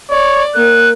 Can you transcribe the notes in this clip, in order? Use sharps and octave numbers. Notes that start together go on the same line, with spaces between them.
C#5 D5
A#3 F#6